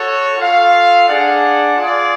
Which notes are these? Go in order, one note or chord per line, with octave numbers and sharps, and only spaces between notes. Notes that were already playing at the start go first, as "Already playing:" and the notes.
Already playing: F#4 A4 C#5
F4 A4 F5
D4 G#4 D5 F#5
F4 G#4 D5